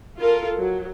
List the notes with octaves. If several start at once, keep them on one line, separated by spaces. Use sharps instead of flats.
F4 A4 A#4
F#3